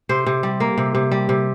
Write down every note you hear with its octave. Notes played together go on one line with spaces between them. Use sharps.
C3 C5
C3
G3
A#3
C3
C3
G3
C3